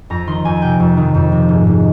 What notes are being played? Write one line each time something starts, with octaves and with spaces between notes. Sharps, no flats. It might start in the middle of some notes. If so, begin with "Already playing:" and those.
F2 A#5
D#3 C6
F2 G#5
C3 G5
F2
D#3
F2
C3
G#2
G#2